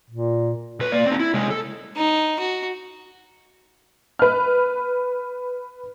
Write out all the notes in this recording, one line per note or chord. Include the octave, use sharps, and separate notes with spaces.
A#2
B1 B4
A#3 D5
C4 D#4
E4
C3 G#3
A4
D#4
F#4
B4 F6